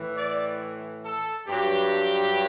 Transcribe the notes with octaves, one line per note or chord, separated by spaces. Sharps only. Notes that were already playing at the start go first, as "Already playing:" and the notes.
Already playing: A2 E3
D5
A4
G2 F#3 G4